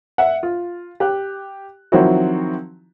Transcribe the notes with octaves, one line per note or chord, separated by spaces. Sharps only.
E5 F#5
F4
G4 F#6
D#3 F3 F#3 C4 E4 F#4